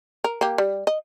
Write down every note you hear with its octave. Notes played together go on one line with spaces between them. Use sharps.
A#4
A#3 G4
G3
D#5